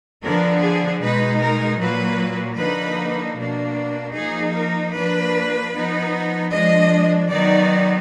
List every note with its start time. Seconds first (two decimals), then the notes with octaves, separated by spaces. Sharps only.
0.23 D3 F3 B3 D4 A#4
0.62 G#4
1.02 B2 G#3 D#4 B4
1.41 A#4
1.80 A#2 F#3 A#3 B4
2.59 D3 F3 A#3 D#4 B4
3.37 B2 A#3 D4
4.16 F3 A#3 D#4 G#4
4.55 A#4
4.95 F3 A#3 D4 B4
5.73 F3 B3 D#4
6.52 F3 G#3 D4 D#5
7.31 D#3 F#3 B3 D#4 D5